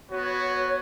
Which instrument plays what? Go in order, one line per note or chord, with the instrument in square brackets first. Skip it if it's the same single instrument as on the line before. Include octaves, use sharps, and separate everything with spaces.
[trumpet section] B3 F#4 [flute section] C#5